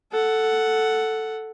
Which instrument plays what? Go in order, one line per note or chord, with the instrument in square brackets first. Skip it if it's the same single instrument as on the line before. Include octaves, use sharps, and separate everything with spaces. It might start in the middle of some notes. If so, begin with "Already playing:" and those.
[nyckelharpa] A4 F#5